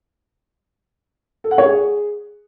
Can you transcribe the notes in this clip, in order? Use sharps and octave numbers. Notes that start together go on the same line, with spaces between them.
A4
F#5
C#5
G#4